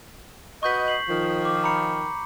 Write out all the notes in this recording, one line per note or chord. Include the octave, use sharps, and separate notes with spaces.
F#4 B4 D#5 C#6 G6 B6
B6 C7 F#7
D#3 F3
D6
A#5 B5 C#7